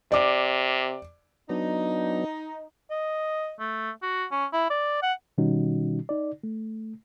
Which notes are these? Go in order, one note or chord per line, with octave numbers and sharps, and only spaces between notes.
C3 D5 D6
F#3 B3 D4 D#4
D#5
A3
F#4
C#4
E4
D5
F#5
B2 D#3 G3 C#4 D#4 F#4
D#4 D5
A3